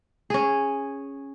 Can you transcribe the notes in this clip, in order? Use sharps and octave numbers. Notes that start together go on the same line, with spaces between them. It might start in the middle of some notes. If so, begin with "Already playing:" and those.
C#4 G#4